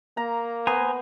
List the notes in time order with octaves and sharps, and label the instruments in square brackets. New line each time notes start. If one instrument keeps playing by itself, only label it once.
[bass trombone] A#3 [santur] A#5
[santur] B3 [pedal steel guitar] C5 G#5 A#5